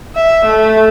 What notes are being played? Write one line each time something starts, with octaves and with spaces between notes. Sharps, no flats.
E5
A3